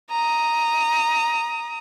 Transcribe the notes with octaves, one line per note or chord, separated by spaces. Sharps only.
A#5 D#6